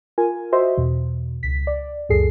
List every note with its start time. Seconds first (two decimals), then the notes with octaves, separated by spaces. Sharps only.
0.18 F4 A#4 G#5
0.52 F#4 C5 D#5 E5 C6
0.77 E2 B2
1.43 C#2 B6
1.67 D5
2.09 C#2 F#2 A#2 G#4 A4 C7